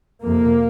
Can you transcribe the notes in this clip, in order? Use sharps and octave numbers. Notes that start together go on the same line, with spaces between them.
F2 C3 A#3